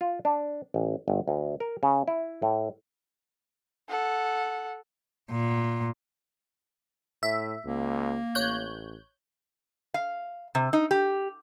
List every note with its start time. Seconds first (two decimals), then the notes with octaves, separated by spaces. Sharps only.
0.01 F4
0.25 D4
0.74 A1
1.08 G1
1.28 D2
1.60 A#4
1.83 C#3
2.08 E4
2.42 A2
3.89 A4 F#5
5.31 A#2
7.23 A2 E5
7.66 C#2 A#3
8.35 A1 C#5 F#6 G6
9.94 F5
10.55 C3
10.73 D#4
10.91 G4